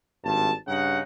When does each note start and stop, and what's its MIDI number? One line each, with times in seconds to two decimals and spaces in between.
0.24 0.52 32
0.24 0.52 43
0.24 0.52 81
0.67 1.01 43
0.67 1.01 49
0.67 1.01 63
0.67 1.01 78